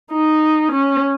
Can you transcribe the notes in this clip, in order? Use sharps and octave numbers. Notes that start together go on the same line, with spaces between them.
D#4
C#4